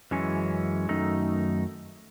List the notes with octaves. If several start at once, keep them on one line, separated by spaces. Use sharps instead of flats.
F#2 E3 G#3 C#4
F#2 D#3 A3 D#4